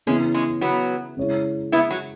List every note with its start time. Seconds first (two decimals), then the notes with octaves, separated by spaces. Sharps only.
0.07 C#3 E3 G#3 B3 C#4
0.34 G#3 C#4
0.61 F#3 B3
1.17 C#3 G#3 E4 C#5
1.72 B3 E4
1.91 F#3